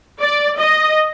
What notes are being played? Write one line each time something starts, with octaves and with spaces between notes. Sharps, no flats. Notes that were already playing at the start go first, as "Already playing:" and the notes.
D5
D#5